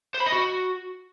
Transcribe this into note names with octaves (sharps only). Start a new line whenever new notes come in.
C5
B5
D#5
F#4